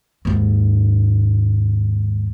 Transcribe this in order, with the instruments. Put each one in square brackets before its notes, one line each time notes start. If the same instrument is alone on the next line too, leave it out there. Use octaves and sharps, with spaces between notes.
[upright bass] D#2 G#2